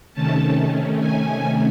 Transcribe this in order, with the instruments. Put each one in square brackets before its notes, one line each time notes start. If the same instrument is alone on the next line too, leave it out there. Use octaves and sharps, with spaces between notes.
[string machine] C3 D#3 A3 C#4 A5
G#5